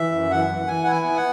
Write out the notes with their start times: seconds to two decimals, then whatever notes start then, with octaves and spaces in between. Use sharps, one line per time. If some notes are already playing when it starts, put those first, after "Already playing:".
Already playing: E3 E5
0.12 F#2
0.31 E3 F#5
0.49 E3
0.67 E3 G#5
0.84 E4 F#5
0.92 G#5
1.04 B3
1.16 F#5